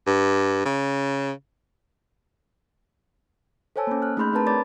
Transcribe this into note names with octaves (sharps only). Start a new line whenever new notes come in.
G2
C#3
A4 C5 C#5 G#5 A5 E6
A#3 C#4
F6 F#6
A3 D#4 G#4 B5 C6 G6
C4 D4 A#4 B4 A5 A#5
C#5 D5 A5 B5 D6 A6